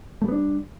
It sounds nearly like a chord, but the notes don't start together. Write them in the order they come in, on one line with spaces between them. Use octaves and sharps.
A3 G3 B3 D4